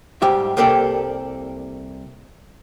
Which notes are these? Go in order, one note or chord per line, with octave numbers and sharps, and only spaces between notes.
G#2 G3 G4 E5
C2 A#3 G4 A4 D5